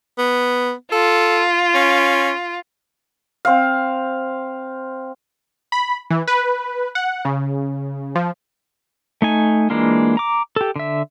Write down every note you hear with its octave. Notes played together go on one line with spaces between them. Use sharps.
B3
F4 A4
C#4
C4 F5
B5
E3
B4
F#5
C#3
F3
A3 D#4 G#5
E3 G#3 A#3 D4 F4
A#5 D6
G4 A4
D3 E5